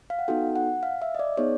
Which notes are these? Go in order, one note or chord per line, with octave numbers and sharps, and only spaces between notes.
F5
F#5
B3 D#4 F#4 A4 G5
F#5
F5
E5
D#5
D5
B3 D#4 G#4 C#5